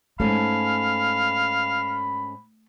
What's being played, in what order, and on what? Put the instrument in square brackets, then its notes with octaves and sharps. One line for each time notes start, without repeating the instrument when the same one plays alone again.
[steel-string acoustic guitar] G#2 C#4 A4 [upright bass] A3 [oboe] F5 [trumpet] B5